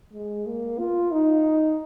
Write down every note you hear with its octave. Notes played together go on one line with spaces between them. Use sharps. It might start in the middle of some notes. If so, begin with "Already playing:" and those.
G#3
A#3
F4
D#4